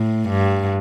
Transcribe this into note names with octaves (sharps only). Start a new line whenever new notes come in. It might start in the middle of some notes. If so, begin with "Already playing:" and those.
Already playing: A2
G2